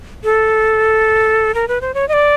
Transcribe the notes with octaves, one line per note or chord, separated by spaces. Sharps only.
A4
A#4
B4
C5
C#5
D#5
D5